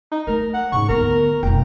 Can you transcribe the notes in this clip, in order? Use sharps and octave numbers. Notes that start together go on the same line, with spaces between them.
D#4
A3 A#4
F#5
G#2 C#3 C#6
D2 B3 A#4
F1 B1 G5